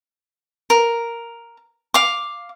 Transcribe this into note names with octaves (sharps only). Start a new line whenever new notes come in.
A#4
F5 D6